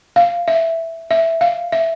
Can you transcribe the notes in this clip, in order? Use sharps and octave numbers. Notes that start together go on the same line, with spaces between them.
F5
E5
E5
F5
E5